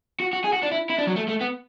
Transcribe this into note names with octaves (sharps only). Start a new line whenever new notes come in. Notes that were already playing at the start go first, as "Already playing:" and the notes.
F#4
F#4
G#4
F#4
D4
E4
E4
D4
F#3
A3
A3
B3